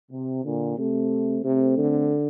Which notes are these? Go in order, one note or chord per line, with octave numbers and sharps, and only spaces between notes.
C3
A#2 D3
C3 A3 C4
C3 A3 C4
D3